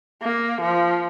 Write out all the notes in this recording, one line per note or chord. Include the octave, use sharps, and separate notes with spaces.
A#3
F3